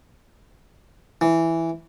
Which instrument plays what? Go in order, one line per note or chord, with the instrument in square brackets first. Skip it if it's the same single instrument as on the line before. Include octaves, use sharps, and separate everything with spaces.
[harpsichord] E3